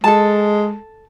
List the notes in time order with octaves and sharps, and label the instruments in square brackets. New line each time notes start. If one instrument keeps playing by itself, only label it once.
[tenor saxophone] G#3 [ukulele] A4 A5